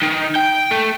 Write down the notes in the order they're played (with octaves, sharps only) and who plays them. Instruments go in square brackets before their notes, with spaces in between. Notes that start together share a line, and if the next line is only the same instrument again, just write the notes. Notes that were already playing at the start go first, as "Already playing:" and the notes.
[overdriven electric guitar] D#3
G5
A3